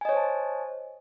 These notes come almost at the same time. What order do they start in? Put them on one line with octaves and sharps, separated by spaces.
G#5 D#5 C#5 C5 A5